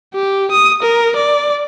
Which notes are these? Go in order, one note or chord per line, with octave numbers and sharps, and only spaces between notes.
G4
D#6
A#4
D5